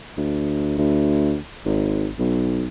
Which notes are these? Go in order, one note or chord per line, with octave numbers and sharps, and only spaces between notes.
D2
D2
G#1
B1